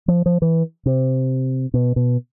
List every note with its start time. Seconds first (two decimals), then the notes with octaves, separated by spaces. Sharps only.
0.08 F3
0.26 F3
0.42 E3
0.86 C3
1.74 B2
1.96 B2